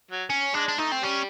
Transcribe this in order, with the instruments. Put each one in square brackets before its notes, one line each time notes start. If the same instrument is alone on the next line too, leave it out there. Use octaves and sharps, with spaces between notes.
[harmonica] F#3
[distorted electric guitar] C#4
[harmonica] G#3 [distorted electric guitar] D4
[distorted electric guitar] D4
[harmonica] A3 [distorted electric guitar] D#4
[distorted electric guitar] C4
[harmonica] G3 [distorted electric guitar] C#4